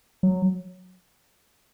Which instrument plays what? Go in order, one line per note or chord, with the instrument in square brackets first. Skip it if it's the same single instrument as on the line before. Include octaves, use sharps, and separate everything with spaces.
[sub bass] F#3